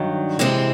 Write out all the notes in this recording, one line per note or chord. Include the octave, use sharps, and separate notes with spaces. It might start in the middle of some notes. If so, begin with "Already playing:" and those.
Already playing: G2 D#3 F#3
C3 E3 G#3 C4